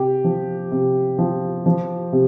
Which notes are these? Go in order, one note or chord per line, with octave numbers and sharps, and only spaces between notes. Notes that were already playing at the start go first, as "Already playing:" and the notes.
Already playing: C3 G4
F3
C3
F3
F3
C3